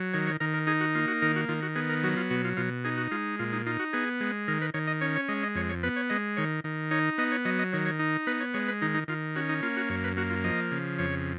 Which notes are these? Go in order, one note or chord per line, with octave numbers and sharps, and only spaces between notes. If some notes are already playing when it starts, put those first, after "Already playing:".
Already playing: F#3
D#3 C#5
C#5
D#3 A#4
A#4
D#4 G#4
F#4
A#3 F4
F#4
D#3 A#4
F#4
D#3 F4
F#4
B3 G#4
A#4
F#3 F#4
F4
B2 F#4
F4
B2 F4
D#4 G#4
F#4
G#3 F4
A#2 F4
D#4
D#4 F4
F#4
B3 G#4
G#3
D#3 A#4
B4
D#3 C#5
D#5
C#4 C#5
C#5
G#3 D#5
D#5
F2 C#5
C#5
B3 B4
C#5
G#3 D#5
D#3 C#5
D#3
D#4 C#5
B3 D#5
C#5
F#3 D#5
D#5
D#3 C#5
C#5
D#4
B3 B4
C#5
G#3 C#5
B4
D#3 D#4
D#4
D#3 F4
C#4 F#4
D#4
A#3 F4
F#4
F#2 C#5
B4
A#3 F#4
F4
F3 D#5
C#3
F2 C#5